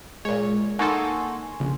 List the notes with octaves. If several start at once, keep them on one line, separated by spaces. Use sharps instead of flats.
A#2 G#3 C#5
A#3 D#4 A4 F#5 G#5 C6 C#6
A#1 C#3